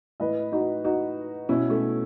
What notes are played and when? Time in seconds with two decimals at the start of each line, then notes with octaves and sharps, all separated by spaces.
0.20 A2 E3 B4 D#5
0.52 D#4 F#4
0.84 D#4 F#4
1.49 B2 C#4 E4
1.70 A3 C#4